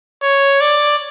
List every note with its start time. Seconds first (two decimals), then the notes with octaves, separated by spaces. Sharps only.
0.23 C#5
0.61 D5